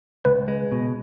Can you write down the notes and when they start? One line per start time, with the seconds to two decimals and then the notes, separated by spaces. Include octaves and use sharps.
0.25 C#2 B4
0.48 G#3
0.72 B2